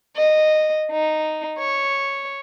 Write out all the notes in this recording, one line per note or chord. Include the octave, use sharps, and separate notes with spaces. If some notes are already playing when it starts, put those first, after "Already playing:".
D#5
D#4
C#5